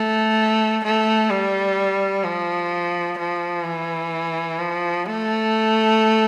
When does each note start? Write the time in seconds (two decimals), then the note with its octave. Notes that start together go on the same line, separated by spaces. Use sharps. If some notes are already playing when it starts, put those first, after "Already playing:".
Already playing: A3
0.84 A3
1.30 G3
2.24 F3
3.19 F3
3.65 E3
4.59 F3
5.06 A3